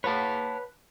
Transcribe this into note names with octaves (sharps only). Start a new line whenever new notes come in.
B4 C#5 F#5 A5